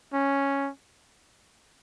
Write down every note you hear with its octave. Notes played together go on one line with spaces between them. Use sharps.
C#4